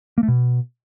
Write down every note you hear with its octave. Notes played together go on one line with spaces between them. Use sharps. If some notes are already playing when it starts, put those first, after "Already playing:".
A#3
A3
B2